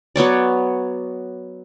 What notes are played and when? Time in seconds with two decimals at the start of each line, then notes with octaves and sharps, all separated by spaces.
0.16 F#3 B3 C#5 D5